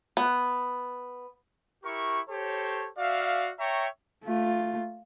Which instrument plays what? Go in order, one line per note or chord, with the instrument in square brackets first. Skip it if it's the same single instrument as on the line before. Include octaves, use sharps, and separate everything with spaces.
[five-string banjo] B3
[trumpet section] E4 G4 A#4 C#6
G4 A4 C5 C#5
F#4 D5 E5 F5
C#5 E5 G5 A#5 C#6
[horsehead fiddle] A3 F4